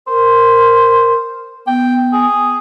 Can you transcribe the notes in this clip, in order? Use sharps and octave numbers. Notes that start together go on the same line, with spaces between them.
A#4 C5
B3 G5
G#4